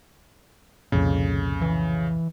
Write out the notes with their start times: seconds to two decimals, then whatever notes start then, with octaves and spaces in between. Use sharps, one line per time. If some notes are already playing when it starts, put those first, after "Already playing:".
0.92 C2 F2 A#2 C#3
1.61 E3